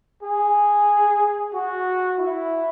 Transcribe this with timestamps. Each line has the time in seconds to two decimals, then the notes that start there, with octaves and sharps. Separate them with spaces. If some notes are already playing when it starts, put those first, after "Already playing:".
0.23 G#4
1.53 F#4
2.19 E4